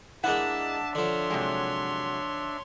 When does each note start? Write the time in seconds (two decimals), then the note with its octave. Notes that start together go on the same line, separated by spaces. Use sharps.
0.24 G#3 A#3 D4 E4 E5 F#5 A5
0.95 D3 F3 C#5 C6
1.30 C3 F#3 G#3